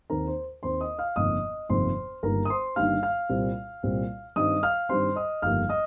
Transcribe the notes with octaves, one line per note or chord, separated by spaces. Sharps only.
D#2 D#3 C4 A#4 A#5
C5
D#2 D#3 C4 C5 C6
D#5 D#6
F5 F6
G1 F2 C3 D#3 A#3 D#5 D#6
G1 F2 C3 D#3 A#3 C5 C6
G1 G2 D#3 G3 A#3 A#4 A#5
D#6
C5 C6
G1 G2 D#3 G3 A#3 F5 F6
F5 F6
C2 A#2 G3 C4
C2 A#2 G3 C4
G2 D#3 G3 C4 D#5 D#6
F5 F6
G2 D#3 G3 C4 C5 C6
D#5 D#6
G1 F2 D#3 G3 A#3 F5 F6
D#5 D#6